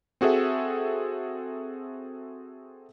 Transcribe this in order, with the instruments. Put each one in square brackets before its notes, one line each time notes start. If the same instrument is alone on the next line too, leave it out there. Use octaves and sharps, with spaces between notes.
[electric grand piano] C4 F#4 G#4 A4 E5